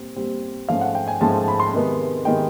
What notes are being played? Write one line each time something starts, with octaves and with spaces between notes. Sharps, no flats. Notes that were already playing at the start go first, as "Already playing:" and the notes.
Already playing: A#2 G3 C4
A#2 G3 C4
G#2 F3 A3 C#4 F5
F#5
G5
G#5
G#2 F3 A3 C#4 A5
B5
C6
C3 D#3 G#3 B3
C3 D#3 G#3 B3 G5